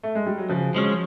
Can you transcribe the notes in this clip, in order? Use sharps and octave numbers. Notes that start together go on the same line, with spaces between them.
A3
G#3
G3
F#3
C#3 F3
F3 F#3 G#3 C#4